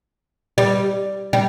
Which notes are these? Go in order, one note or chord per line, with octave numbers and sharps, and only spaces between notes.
G3
G3